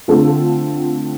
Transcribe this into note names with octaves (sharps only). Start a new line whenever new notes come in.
D3 A3 C4 F4 A4